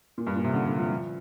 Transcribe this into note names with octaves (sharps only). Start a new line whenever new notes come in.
A#2
G2
A#2
C3
D3
D3
F3
F3